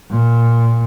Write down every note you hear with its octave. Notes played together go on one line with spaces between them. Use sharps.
A#2